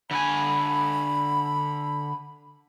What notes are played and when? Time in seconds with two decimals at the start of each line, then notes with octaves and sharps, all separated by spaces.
0.11 D3 G#5 B5